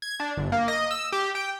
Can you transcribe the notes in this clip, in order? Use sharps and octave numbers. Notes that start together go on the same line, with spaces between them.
G#6
D4
G1
A#3
D#5
E6
G4
G5